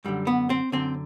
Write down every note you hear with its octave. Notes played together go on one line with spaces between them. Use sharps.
F#2 D3 G3
B3
C4
F#2 D3 C4